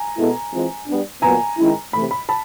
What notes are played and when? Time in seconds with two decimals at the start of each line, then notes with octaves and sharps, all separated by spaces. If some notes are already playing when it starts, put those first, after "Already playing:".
Already playing: G#5 A#5
0.18 B2 G#3 B3 E4 A4
0.52 E3 G#3 C4 F4
0.88 G3 B3 D4
1.22 A#2 F#3 B3 G#5 A#5
1.58 D#3 G#3 C#4 E4
1.93 C3 E3 A3 B5
2.11 B5
2.29 A5 B5